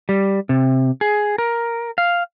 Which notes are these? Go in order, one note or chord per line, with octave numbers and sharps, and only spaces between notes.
G3
C3
G#4
A#4
F5